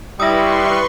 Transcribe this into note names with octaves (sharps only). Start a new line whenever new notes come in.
G3 E4 B4 C6 C#6 D#6 E6 A#6